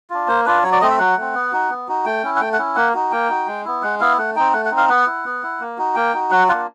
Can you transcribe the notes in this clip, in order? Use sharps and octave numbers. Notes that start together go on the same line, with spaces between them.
D4 F4
A#3 C5
D4 F4 B4
F#3 C#5
D5
A3 C4 D#5
E5
F#3 F#5
A3 C4
B3
D#4 F#4
B3
D#4 F#4
A3 G5
C#4 E4
F#5
A3 G5
F#5
C#4 E4
A#3 F#5
D#4 F#4
A#3 G5
D#4 F#4
G#3
B3 E4
G#3 F#5
B3 E4 F5
A3 F#5
C4 D#4 G5
A3 F#5
F#5
C4 D#4
F5
B3 F#5
E4
B3
E4
A#3
D#4 F#4
A#3 G5
D#4 F#4
F#3 F#5
A#3 D4 F4 F#5